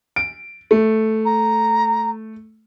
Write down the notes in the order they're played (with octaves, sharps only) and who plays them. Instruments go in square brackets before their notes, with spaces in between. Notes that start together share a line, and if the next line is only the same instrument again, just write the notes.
[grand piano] D7
A3
[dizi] A#5